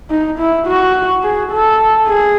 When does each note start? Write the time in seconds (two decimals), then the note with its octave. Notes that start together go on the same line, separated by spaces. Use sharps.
0.10 D#4
0.39 E4
0.67 F#4
1.23 G#4
1.52 A4
2.07 G#4